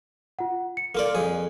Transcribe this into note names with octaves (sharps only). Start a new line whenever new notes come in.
F4 F#5
C#7
A#3 F4 A4 D5
F2 G#4